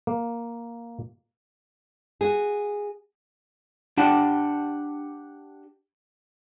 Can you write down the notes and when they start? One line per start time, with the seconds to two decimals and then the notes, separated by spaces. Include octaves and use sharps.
0.07 A#3
2.21 F#4 G#4
3.97 D4 G4 F#5 A5